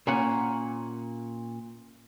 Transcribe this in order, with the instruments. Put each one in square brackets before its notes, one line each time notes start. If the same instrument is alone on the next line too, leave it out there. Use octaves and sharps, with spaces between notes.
[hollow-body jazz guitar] A#2 C#4 F#5